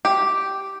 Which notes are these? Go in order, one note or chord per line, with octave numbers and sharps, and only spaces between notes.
G4